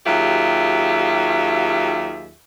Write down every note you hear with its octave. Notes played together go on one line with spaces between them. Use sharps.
D#2 F#3 F4 G4 G#4 E5